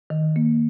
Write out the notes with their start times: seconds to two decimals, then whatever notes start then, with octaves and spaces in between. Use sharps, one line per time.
0.10 D#3
0.36 A#3